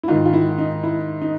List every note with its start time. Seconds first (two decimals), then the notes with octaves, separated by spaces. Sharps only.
0.03 E4
0.08 G#2 D#3 F4
0.26 F4
0.33 E4
0.58 D#4
0.84 E4
1.22 D#4